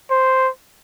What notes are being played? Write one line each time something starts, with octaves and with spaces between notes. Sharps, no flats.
C5